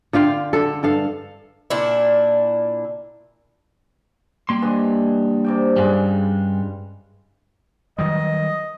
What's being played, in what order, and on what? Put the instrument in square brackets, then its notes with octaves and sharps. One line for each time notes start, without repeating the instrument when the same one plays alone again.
[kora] D3 F4 F5 G5
D3 A4
G2 A4 F5
[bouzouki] A#2 D4 E4
[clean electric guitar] G3 A#3 C6
[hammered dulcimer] G2 E3 D#5
C3 D5 G5
[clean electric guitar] G2 G3 [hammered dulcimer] C#3 G#3
[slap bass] D#3 F#3 G3 [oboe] D#5